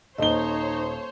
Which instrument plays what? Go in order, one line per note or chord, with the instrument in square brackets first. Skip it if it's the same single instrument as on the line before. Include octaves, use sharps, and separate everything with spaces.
[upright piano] D#1 G7 [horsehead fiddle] D#4 [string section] C5 C#5 [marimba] D#5